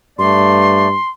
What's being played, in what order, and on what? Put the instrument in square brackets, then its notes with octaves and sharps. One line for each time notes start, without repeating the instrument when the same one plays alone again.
[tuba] G2 [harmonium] A3 D5 [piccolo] C6